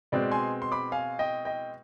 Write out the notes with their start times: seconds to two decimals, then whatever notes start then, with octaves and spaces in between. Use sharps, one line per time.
0.12 B2 G#3 C4 B4 D5
0.32 G#5 C6
0.62 C6
0.72 B5 D6
0.92 F5 G#5
1.19 D#5 G5
1.45 D#5 G5